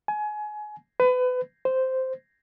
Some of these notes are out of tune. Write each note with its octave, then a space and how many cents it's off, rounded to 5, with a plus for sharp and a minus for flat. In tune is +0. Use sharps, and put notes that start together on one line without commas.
G#5 +25
B4 +30
C5 -5